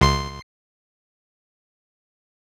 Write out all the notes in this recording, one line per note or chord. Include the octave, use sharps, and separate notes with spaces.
C#2 C6 C7